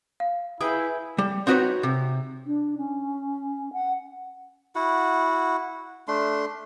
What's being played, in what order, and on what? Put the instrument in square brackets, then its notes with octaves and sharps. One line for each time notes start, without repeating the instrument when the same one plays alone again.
[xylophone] F5
[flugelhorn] E4 [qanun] G#4 B4 G5 [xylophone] D#6
[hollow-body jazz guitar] G3
C4 D#4 F#4 A#4 B4 C#5
C3
[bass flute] D4
C#4
F#5
[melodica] E4 F#4 F#5
A3 D4 C6